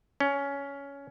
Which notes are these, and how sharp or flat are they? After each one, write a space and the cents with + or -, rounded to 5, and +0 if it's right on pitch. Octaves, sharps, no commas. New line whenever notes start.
C#4 +15